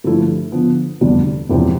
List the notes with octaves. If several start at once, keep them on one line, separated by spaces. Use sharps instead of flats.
G2 D3 F3 A3 E4
D3 F3 B3
F1 E2 D3 G3 D4
E1 E2 C3 F3 C4